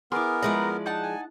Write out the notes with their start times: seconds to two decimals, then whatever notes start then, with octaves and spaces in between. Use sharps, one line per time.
0.12 B3 E4 G#4 A#4 C6 D6
0.42 F3 G#3 A3 B4 D5 A#5
0.86 D#4 F#5 A5
1.03 G#5